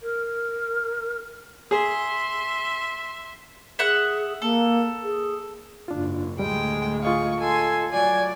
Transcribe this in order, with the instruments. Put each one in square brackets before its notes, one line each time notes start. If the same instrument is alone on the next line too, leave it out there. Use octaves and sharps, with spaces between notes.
[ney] A#4
[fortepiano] G#4 [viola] E5 C6
[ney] G#4 [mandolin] E5 F#5 F#6
[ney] A#3 [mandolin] A4
[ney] G#4
[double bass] F#1 G#2 [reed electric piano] D4 F4
[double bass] D2 A2 [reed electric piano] G3 [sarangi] G#3 [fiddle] G5
[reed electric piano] F4 D#5 F5 [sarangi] G#4 [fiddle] C#6
[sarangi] A4 [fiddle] G#5 C6
[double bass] F#3 [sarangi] D5 [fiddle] G#5